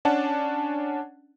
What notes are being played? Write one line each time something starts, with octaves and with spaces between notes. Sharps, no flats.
C#4 D4 F#5 A5